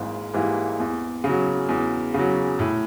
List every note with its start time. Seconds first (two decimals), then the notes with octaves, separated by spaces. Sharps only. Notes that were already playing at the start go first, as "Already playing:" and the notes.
Already playing: G#1 G#2 E3 A#3
0.34 G#2 E3 G3 A#3
0.80 E2
1.24 C#3
1.29 F#3
1.69 E2
2.14 C#3 F#3
2.59 A2